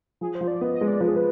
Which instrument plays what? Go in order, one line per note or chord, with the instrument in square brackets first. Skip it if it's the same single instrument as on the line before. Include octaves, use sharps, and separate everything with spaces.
[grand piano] F3 [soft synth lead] G#4
[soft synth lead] C5
[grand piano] F3
[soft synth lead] D5
[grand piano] B3 [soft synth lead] D#5
[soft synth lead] D#5
[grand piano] G#3
[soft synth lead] D5
[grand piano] F3 [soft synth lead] B4
[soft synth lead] G#4
B4